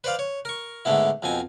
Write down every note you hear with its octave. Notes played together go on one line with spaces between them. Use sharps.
B4 C5 D5 F5
C#5
A#4 C#6
G#2 D3 A3 B3 E4
F2 B2 C4 G#5